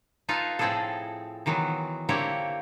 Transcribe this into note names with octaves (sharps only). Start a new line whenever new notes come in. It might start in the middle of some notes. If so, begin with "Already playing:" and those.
D#4 F4 A4 B4 E5 F5
A2 F3 C4 E4 G#4 A4
D#3 E3 F#3 B3
D3 A#3 C4 E4 G4 C#5